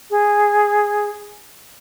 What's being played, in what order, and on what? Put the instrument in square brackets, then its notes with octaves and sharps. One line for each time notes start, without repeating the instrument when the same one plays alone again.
[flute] G#4